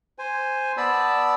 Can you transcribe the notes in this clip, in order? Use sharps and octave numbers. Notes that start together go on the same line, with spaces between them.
C5 G#5
B3 D5 A5 B5 E6